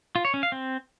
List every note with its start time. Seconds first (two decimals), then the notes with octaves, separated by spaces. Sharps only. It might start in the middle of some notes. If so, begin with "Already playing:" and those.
0.16 F4
0.25 C#5
0.34 C#4
0.43 F5
0.52 C4